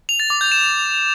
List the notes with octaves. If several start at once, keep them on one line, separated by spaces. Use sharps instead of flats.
F7
A6
D6
G6
E7